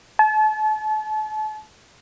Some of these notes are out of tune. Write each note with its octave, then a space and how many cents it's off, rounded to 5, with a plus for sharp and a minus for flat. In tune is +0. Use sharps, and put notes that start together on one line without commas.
A5 -40